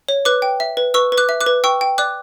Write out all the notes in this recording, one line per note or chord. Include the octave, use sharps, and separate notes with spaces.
C#5
B4 D6 F#6
G5
E5
B4
B4 C#6 E6
B4
D6 F#6
E5
D6 F#6
B4
G5 C#6 E6
G5
D5 D6 F#6